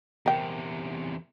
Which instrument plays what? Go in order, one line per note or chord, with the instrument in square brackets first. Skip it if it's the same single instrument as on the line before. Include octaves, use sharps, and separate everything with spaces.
[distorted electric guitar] E2 C3 [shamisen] A#4 G5